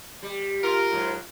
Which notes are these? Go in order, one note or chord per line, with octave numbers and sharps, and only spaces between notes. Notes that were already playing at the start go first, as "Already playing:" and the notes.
G3
F4 A#4
G#2 F#3